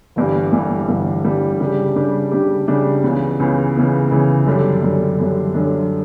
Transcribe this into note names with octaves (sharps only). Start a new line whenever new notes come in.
G1 G2 E3 G3
G1 G2 E3 G3
G1 G2 E3 G3
G1 G2 E3 G3
C#3 G3 D4 G4
C#3 G3 D4 G4
C#3 G3 D4 G4
C#3 G3 D4 G4
C#2 C#3 E3 B3
C#2 C#3 E3 B3
C#2 C#3 E3 B3
C#2 C#3 E3 B3
F#2 D3 G3 D4
F#2 D3 G3 D4
F#2 D3 G3 D4
F#2 D3 G3 D4